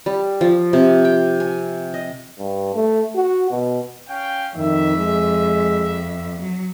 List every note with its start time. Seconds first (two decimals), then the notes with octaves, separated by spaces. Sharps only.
0.06 G3
0.41 F3
0.73 C3
1.05 G5
1.40 G#5
1.94 D#5
2.39 G2
2.75 A3
3.15 F#4
3.51 B2
4.09 C#4 F5 G5
4.56 F2 D#3 E5
4.97 G#3
6.42 F#3